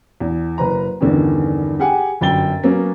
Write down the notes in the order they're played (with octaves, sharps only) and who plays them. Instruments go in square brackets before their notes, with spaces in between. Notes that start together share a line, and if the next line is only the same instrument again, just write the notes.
[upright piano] E2
F#1 B4 A#5
E2 G2 D3 D#3 B3 C#4
G4 G#4 F#5 G#5
G1 F#2 G5 A6 G7
F#3 A#3 B3 C#4